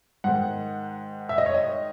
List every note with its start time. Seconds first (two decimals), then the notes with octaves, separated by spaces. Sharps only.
0.24 G#2 D#3 F#5
1.29 E5
1.38 D#5
1.46 C#5
1.54 D#5